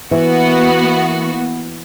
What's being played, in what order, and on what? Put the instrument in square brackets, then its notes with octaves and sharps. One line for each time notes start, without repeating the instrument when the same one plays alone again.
[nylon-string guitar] E3 [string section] A#3 B3 F#4